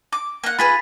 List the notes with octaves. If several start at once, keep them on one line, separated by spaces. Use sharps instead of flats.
D6
A#3 F#5
F4 G#4 B4 B5 A6 B6